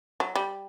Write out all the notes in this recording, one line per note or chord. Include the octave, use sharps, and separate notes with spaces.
F#3
G3